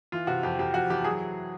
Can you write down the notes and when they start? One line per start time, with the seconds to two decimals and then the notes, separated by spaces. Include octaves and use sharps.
0.12 E3 F4
0.27 C3 F#4
0.43 F2 G4
0.59 F2 G4
0.74 F2 F#4
0.90 E3 G4
1.04 F#3 G#4